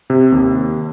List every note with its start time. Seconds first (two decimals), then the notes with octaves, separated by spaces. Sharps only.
0.10 C3
0.32 D#2